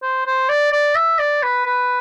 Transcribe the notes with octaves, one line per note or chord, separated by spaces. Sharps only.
C5
C5
D5
D5
E5
D5
B4
B4